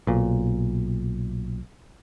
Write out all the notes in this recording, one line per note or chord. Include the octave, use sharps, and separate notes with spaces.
B1 A#2